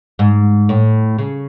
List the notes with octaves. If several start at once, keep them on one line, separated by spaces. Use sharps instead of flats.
G#2
A2
C#3